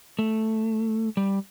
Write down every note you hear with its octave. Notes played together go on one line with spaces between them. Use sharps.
A3
G3